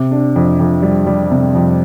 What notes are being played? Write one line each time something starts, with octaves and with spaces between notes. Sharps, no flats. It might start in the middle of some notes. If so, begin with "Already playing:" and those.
Already playing: C3
D4
F2
F2
G3
G3
C3
F2